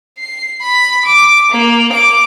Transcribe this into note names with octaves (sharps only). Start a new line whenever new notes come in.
C7
B5
D6
A#3
D6